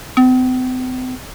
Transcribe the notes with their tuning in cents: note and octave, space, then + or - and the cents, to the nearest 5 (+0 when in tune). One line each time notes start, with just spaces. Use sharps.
C4 -45